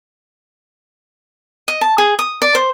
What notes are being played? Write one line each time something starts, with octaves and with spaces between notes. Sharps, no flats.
D#5
A5
G#4
D#6
D5
C5